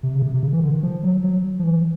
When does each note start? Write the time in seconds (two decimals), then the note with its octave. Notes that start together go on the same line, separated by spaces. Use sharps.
0.03 C3
0.15 C#3
0.22 C3
0.34 C3
0.43 C#3
0.53 E3
0.63 D3
0.73 D#3
0.83 F3
1.03 F#3
1.24 F#3
1.59 F3
1.64 E3